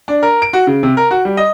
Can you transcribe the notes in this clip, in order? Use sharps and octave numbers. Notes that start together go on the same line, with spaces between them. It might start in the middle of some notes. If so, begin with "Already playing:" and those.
D4
A#4
D7
F#4
C#3
C3
A#4
F#4
G3
D#5